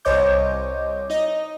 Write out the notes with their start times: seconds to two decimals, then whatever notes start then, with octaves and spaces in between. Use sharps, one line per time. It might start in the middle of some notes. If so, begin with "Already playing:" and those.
0.05 C2 C5 C#5 D#5 D6 G6
1.10 D#4 D#5